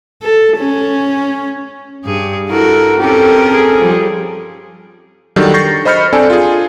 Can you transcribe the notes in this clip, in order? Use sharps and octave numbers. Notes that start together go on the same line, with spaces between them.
A4
C#4
G2 G#4
E4 F#4 A4 A#4
C4 C#4 G4 A4 A#4
G#4 A4
F3 G3
D#3 F#3 G3 D4 G4 A4
C#6 G6 A6 A#6 C7
C5 D#5 B5 F6 G6 C#7
C4 D4 A4 D5 G#5
F4 G#4